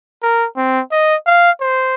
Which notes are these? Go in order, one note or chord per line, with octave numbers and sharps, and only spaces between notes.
A#4
C4
D#5
F5
C5